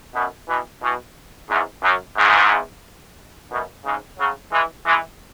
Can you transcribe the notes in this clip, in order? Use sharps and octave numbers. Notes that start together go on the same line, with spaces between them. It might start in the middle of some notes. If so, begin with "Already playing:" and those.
F#2 B2
B2 E3
B2 E3
E2 G#2
F#2
E2 G#2
F#2 B2
G#2 C#3
C#3 F#3
E3 G#3
E3 G#3